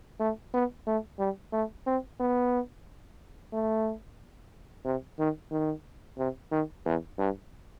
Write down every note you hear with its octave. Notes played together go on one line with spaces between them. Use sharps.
A3
B3
A3
G3
A3
C4
B3
A3
C3
D#3
D#3
C3
D#3
E2
G2